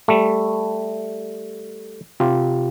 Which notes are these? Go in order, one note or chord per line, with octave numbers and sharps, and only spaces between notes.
G3 A3
C3 F4 G4